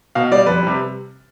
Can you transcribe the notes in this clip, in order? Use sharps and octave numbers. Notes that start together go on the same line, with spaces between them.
B2 F5
G3 D5
F2 B4
C3 G3